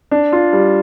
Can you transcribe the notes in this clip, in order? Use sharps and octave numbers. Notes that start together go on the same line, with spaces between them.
D4
F4
G3